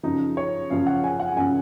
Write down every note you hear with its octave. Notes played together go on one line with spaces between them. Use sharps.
F#2 C#3 F3 D#4
C#5
F#2 C#3 F3 F5
F#5
G#5
F#5
F#2 C#3 F3 G#5